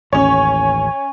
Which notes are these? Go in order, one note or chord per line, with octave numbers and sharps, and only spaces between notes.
A1 D#2 C#4 C#5 G#5